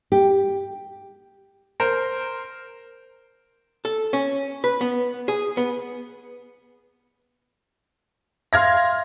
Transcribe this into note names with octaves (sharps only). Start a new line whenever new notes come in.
G4
A#4 C5
A4
C#4
B4
B3
G#4
B3
E5 F5 C6 F6 G#6 A#6